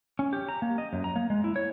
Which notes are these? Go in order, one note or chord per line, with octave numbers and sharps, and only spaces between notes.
C#4
G4
A#5
A#3
D#5
F#2
A#5
A#3
G#3
E4
C#5